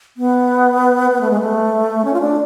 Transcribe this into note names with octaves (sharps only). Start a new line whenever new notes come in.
B3
B3
A3
G#3
A3
C#4
F4
D4